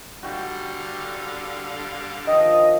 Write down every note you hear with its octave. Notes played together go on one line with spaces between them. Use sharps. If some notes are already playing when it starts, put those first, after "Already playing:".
D3 G3 F#4 F5 G5
D#3 F3 D#5